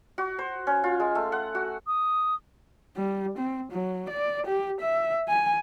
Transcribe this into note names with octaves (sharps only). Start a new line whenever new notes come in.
F#4
C5
C#4
F4
G#3
A3
F#5
F#4
D#6
G3
C4
F#3
D5
G4
E5
G#5